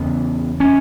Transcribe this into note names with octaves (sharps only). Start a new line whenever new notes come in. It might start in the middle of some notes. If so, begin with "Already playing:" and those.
Already playing: E2 C#3 B3
C#4